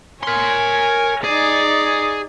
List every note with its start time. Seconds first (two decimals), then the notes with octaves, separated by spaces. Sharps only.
0.23 A#4 C#5 G#5 C6
1.24 D#4 G#4 D5